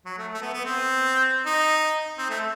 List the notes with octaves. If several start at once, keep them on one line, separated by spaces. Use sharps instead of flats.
F#3
A3
A3
B3
B3
C4
D#4
C4
A3